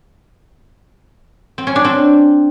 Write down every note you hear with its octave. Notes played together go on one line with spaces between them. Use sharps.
C4
C#4
D4
C4